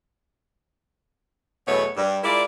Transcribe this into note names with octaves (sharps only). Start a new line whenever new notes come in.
E2 B2 F#3 A3 B4 C#5
G2
G#3 E4 F4 A#4 D5